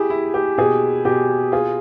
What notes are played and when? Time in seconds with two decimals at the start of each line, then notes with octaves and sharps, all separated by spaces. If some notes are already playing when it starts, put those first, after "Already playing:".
Already playing: E4 G4 G#4
0.10 E4
0.34 G4
0.58 B2 G#4
1.05 B2 G4
1.52 F4 G#4